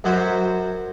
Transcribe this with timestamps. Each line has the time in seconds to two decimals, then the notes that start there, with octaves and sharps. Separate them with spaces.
0.04 F#2 F#3 F#4 C5 C#5 B5